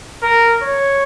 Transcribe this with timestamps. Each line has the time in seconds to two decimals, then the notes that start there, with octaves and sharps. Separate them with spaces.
0.22 A#4
0.62 C#5